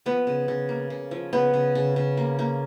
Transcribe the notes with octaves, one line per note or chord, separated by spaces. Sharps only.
F3 B3
C#3
C#3
A#3
C#3
F3
C#3 B3
C#3
C#3
C#3
A#3
A#3